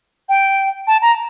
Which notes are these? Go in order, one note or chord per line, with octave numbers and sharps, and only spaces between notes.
G5
A5
A#5